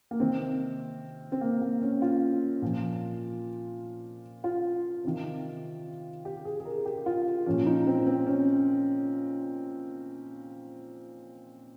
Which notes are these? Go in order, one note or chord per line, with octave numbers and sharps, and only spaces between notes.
A#3
C3 D#3 C4
C4
A#3
A#3
C#4
F4
A#2 F3
F4
C3 D#3
G4
G#4
G#4
A#4
G4
F4
A#2 F3 C#4
D#4
C4
C4
C#4